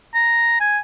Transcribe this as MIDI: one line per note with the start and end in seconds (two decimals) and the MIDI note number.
0.15 0.57 82
0.61 0.79 80